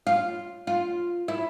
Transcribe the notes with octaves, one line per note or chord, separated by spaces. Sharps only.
F4
F4
E4